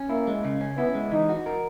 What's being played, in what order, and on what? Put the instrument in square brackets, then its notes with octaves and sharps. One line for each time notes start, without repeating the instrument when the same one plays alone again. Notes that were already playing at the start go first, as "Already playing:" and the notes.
Already playing: [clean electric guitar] C#4
[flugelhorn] A#3 [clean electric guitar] E4
[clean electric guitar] G#3
C#3
C#4
[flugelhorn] B3 [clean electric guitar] E4
[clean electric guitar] G#3
[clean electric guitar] E3 [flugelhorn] D#4
[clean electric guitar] F#4
A#4